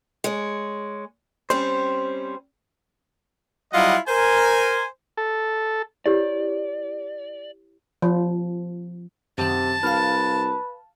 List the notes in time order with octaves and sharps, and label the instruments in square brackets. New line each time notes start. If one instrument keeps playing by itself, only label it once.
[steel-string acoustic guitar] G#3 C#5
[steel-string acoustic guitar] G3 C4 C#4 [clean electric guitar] C5
[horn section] F#3 G3 E4 F4 D#5 F#5
A#4 C5 G#5
[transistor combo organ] A4
[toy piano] E4 G4 C#5 [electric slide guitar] D5
[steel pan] F3
[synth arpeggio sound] F#2 D#3 [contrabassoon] C3 [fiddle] A5
[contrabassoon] C2 [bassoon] B4 [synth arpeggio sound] F5 F6